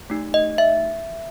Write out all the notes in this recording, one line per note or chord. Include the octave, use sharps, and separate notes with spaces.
A3 D#4 G4
D#5
E5